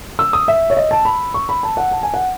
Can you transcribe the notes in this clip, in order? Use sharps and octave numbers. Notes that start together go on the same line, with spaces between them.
E6
D#6
E5
C#5
D#5
A5
B5
C#6
B5
A5
F#5
A5
G#5
F#5